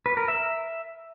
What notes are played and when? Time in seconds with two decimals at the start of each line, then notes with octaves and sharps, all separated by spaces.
0.06 B4
0.17 A#4
0.28 E5